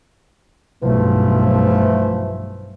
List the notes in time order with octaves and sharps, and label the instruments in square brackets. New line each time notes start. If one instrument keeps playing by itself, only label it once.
[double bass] B1 G2 [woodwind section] E3 F3 A3